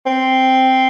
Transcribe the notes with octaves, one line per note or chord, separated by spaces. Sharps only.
C4